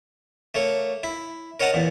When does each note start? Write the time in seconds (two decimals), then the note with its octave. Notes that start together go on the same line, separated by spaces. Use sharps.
0.55 A3 A#3 C#5
1.03 E4
1.60 A#4 C#5 D#5 F#5 A5 A#5
1.74 E2 A#2